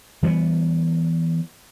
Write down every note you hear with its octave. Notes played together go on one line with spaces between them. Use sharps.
E3 G3 A3 B3